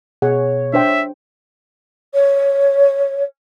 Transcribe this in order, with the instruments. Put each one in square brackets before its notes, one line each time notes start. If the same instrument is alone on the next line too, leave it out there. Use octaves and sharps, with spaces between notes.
[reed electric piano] B2 [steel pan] G#4 F#5 [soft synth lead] C#5
[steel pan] D4 C5 G5 [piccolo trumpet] E5
[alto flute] C#5